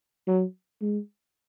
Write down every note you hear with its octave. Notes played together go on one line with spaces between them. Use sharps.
F#3
G#3